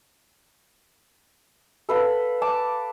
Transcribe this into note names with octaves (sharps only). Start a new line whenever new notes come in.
A4 B4 F5 F#5
A5 D6